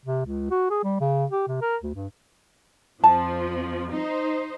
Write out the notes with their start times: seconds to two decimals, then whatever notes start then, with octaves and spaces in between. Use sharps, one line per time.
0.05 C3
0.25 C#2
0.51 F#4
0.70 G#4
0.84 G3
1.00 C#3
1.31 G4
1.47 C3
1.61 A#4
1.83 D2
1.95 G2
3.04 F2 F3 A5
3.92 D#4 C5